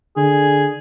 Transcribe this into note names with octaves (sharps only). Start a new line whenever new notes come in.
D3 G#4